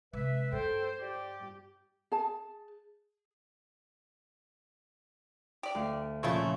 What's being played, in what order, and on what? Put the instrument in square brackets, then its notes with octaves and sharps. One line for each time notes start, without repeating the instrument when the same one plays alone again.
[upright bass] C3 G#3 [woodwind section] B4 E5
[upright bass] G2 [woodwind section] A4 G5 [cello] C5
[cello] G4 [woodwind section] D5
[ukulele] G#4 A5
[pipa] G4 D5
[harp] D2 F5
[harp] A#2 C#3 F3 [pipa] A3 E4 F4